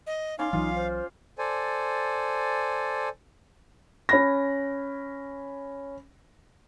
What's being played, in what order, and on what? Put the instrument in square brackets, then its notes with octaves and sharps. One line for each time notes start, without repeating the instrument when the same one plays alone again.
[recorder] D#5
[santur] C#4 D5 C6 [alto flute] D#4 [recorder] F5
[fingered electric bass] B1 E3 F#3 [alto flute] D#4 [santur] F4
[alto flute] C5
[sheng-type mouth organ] A4 C5 D5 G#5
[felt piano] C#4 B5 A#6